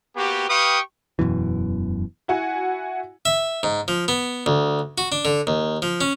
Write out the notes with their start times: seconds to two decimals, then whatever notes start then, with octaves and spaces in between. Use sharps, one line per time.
0.16 A#3 B3 F#4 G4
0.49 G4 B4 F5 G5 C#6 D#6
1.19 E1 F#2 B2 E3
2.28 E4 F#4 F#5 G#5
3.25 E5
3.63 G#2
3.88 F3
4.08 B3
4.46 D2
4.98 F#4
5.12 D4
5.25 D3
5.47 D#2
5.82 F3
6.01 C#4